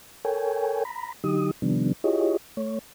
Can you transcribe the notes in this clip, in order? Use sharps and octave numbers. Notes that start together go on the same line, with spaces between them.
A4 A#4 C#5 G5 G#5
A#5 B5
D3 F#3 D#4 G4 D#6
C3 D#3 F3 G3 B3 D4
E4 F4 G4 G#4 C#5 D#5
A3 C#5